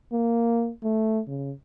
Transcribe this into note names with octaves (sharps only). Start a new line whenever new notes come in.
A#3
A3
C#3